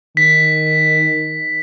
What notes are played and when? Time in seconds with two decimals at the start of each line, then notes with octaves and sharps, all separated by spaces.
0.17 D#3 B6